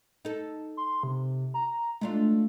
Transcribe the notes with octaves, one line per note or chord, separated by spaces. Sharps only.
D#4 A4
C6
C3
A#5
G#3 A3 D4 F4